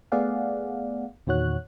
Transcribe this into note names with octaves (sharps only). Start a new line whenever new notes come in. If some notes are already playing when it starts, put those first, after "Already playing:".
A3 B3 G#4 D5 F5 F#5
E2 A#2 D#3 F#4 C#5 F#6